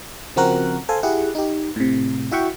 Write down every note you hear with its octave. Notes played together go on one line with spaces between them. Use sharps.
C#3 F3 C4 F#4 A#4 F#6
A4 C5 F5 G#5
E4 G4 G#4 F#5
D#4 G4
A2 C3
E4 F#4 E5 F#5 G5 C#6